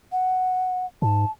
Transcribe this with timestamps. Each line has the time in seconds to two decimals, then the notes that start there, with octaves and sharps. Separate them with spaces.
0.12 F#5
1.02 G#2 A5